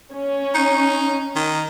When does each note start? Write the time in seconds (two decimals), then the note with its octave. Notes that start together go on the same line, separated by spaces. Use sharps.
0.14 C#4
0.55 D#4
1.36 D#3